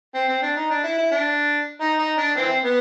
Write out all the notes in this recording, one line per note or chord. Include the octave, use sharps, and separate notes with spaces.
C4
C4
D4
D#4
D4
E4
E4
D4
D#4
D#4
D4
E3 C4
B3